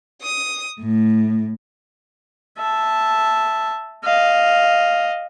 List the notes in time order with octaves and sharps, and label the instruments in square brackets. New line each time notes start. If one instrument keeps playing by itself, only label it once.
[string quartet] D#6
A2
[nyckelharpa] E5 A5
D#5 F5